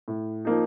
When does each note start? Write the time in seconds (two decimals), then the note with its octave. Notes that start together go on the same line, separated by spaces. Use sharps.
0.08 A2
0.45 F3 A#3 D#4